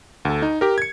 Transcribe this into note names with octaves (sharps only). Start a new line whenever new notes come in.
D2 A4
D#4
G4 A#4
G#6 C#7